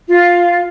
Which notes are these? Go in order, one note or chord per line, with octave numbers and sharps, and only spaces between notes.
F4